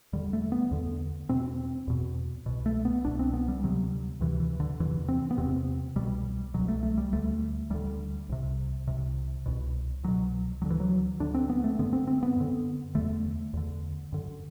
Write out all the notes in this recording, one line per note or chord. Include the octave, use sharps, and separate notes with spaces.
E2 D3 G3
A3
B3
E2 D3
E2 B2 C4
E2 B2
C2 B2
A3
B3
C2 B2 D4
C4
B3
G3
D2 C3 F#3
D2 C3 E3
E3
D3
E2 C3 E3
C4
B3
E2 C3 C4
C2 B2 G3
C2 B2 F#3
A3
A3
G3
D2 D3 A3
D2 D3 G3
C2 C3
C2 C3
C2 B2
C2 B2 F#3
D2 D3 F#3
E3
F#3
D2 D3 D4
C4
B3
A3
F#2 D3 B3
C4
C4
B3
F#2 D3
E2 D3 A3
E2 D3
F#2 D3